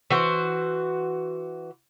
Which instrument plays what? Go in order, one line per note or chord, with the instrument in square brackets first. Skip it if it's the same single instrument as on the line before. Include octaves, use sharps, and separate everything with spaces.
[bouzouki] E3 F#4 C5